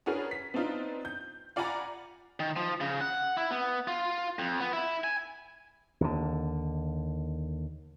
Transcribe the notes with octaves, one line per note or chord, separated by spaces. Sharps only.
C#4 D4 F#4 G#4 A#4 B4
B6
B3 C4 D4 D#4 F4
G6
F4 D5 F#5 G#5 A#5 B5
D#3
F3
C#3
F#5
E4
B3
F4
F2
B3
E4
G#5
D#2 D3